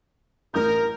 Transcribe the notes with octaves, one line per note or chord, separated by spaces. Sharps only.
A1 A#4 D#6 G6